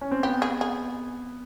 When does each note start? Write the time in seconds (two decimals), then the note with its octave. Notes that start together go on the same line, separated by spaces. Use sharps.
0.01 C#4
0.11 C4
0.23 B3 G4
0.42 G#4
0.61 G#4